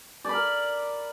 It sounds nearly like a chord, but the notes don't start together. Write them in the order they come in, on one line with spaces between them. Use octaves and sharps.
D5 B5 A#4